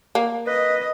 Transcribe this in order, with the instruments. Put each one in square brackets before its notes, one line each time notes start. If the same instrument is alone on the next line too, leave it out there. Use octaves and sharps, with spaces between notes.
[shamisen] A#3
[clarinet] B4 [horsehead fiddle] D#5